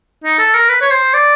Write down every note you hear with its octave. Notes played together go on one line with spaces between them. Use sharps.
D#4
A4
A#4
B4
C#5
C5
D5